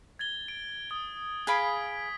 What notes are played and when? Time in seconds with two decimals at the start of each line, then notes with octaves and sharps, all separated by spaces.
0.19 G#6 A6 G7
0.48 D7
0.90 D#6 G7
1.47 G#4 F5 B5 G#6 B6 D7